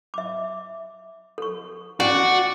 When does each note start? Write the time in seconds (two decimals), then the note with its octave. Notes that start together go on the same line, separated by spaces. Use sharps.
0.14 E5 D6
1.38 A4 C#6
2.00 C#4 F#4 D5 F#5